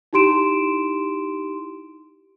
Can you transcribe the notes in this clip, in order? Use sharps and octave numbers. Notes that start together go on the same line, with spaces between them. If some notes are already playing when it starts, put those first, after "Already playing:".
D#4 E4 G4 C6 D7 E7